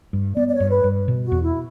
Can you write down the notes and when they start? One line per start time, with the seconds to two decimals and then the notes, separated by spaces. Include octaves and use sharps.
0.13 G2
0.36 B3 D5
0.47 D5
0.54 C#5
0.60 G2
0.72 B4
0.84 G2
1.08 B2
1.26 F#4
1.32 E2
1.43 E4